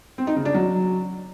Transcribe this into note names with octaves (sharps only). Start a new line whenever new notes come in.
C4
D#4
C#3
D4
F#3